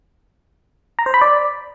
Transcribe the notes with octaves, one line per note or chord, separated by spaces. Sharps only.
A#5
C5
B5
D5